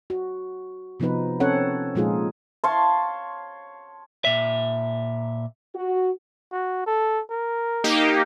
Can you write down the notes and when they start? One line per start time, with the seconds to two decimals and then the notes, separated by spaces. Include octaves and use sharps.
0.10 F#4
1.00 C3 F3 B3 D#4 B4
1.40 C4 C#4 A4 C#5 F#5
1.95 A#2 F3 G#3 D#4 F4 G#4
2.64 C#5 F5 A5 C6
4.25 A#2 E5
5.76 F#4
6.52 F#4
6.86 A4
7.30 A#4
7.84 A#3 D#4 G4